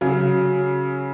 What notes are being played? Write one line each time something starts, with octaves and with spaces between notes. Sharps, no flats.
C#3 F#3